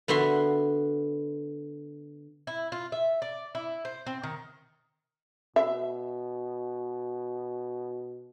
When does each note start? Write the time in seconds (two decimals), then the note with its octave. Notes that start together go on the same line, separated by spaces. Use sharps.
0.08 D3 B3 F#4 E5 C6
2.47 E4
2.72 F4
2.92 E5
3.22 D5
3.55 E4
3.85 C5
4.06 C4
4.23 D#3
5.56 B2 E5